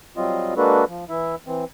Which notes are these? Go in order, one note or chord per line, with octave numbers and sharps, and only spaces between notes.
F#3 G3 C4 F4 D#5
G#3 A#3 D4 F#4 A4 B4
F3
E3 E4 E5
E3 C4